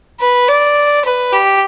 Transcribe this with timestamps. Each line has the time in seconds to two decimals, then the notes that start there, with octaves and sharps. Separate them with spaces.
0.20 B4
0.48 D5
1.05 B4
1.33 G4